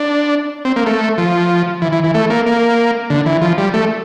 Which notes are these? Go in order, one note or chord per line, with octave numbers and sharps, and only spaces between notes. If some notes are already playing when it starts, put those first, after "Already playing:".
Already playing: D4
C4
A#3
A3
F3
E3
E3
E3
A3
A#3
A#3
D3
E3
F3
G3
A3